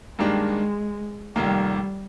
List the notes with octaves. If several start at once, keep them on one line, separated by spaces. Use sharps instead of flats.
G2 D#3 G#3 A#3 D4 G4
F1 D#2 D#3 G3 A#3